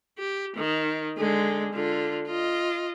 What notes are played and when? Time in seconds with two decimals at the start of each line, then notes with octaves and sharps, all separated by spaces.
0.18 G4
0.56 D#3
1.17 D3 G#3
1.74 D3 F4
2.27 F4 D#5